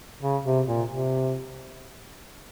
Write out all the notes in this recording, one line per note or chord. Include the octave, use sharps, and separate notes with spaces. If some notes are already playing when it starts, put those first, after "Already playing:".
C#3
C3
A#2
C3